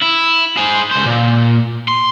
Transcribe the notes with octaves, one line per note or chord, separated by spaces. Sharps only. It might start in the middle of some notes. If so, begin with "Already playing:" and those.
E4
G#4 C5
C#2 C5
A#2
C6